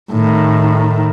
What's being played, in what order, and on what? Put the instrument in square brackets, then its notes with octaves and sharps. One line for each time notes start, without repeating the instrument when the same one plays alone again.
[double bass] A2 D#3